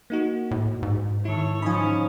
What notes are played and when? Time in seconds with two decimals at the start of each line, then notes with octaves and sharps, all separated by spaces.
0.10 A#3 D#4 F#4
0.51 A2
0.83 G#2
1.25 D#3 E4 A4 C#5
1.62 F3 C#4 D#4 G#5 B5